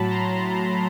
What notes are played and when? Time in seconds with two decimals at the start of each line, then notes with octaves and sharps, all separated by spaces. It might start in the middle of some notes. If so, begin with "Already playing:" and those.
Already playing: A2 F#3 A5 B5
0.10 A#5 C6